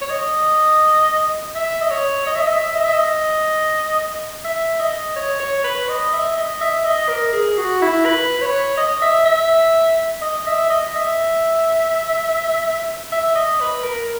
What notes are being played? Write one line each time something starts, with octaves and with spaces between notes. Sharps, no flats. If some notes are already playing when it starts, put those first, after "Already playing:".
C#5
D#5
E5
D#5
C#5
D#5
E5
D#5
E5
D#5
E5
D#5
E5
D#5
C#5
C#5
B4
D#5
E5
D#5
E5
D#5
A#4
G#4
F#4
E4
B4
C#5
D#5
E5
E5
D#5
E5
D#5
E5
E5
D#5
B4
A#4